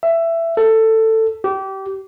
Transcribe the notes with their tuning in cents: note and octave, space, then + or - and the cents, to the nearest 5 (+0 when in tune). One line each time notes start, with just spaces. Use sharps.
E5 +15
A4 +15
G4 -25